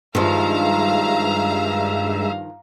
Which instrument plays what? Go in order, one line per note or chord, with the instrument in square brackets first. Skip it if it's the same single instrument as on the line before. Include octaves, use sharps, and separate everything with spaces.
[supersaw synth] G2 [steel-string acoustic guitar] D#3 F3 [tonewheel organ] G#3 E5 [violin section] F5 A#5